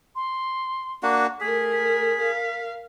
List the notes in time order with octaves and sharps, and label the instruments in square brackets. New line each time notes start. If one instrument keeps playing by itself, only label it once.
[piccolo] C6
[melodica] A#3 D4 F#4
[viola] A3 A#4 [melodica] G#4 [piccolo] B6
[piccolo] B6
[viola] A#4 F5